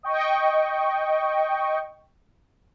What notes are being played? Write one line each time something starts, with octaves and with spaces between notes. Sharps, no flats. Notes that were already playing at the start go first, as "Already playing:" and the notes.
D#5 G5 C#6